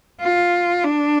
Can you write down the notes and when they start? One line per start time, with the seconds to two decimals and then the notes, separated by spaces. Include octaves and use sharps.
0.20 F4
0.84 D4